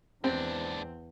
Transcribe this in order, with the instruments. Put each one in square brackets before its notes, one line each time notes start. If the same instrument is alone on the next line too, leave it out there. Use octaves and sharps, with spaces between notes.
[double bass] E2 [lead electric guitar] G#2 D4 [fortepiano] C4